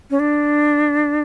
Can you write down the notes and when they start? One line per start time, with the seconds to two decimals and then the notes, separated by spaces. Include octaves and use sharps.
0.10 C#4
0.19 D4